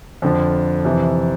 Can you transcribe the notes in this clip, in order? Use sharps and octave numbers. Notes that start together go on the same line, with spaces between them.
F2 D3 F3
F2 C3 E3